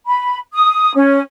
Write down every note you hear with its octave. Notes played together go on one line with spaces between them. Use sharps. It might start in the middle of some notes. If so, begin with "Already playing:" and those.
B5
D#6
C#4